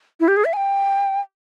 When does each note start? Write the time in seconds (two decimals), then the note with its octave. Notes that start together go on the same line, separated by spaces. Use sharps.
0.20 E4
0.28 G4
0.37 G#4
0.45 E5
0.53 G#5
0.57 G5